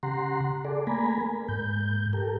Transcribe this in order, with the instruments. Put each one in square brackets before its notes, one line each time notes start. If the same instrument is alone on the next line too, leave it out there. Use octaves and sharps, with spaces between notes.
[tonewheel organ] C#3 G4 F#5 A#5 C6
G#4 A4 D5
A3 A#3 G#5 A#5 B5
A#4
G#2 G6
G4 A4 A#4